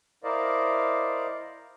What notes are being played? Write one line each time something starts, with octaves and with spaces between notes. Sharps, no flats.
E4 A#4 C5 D5 D#5 F5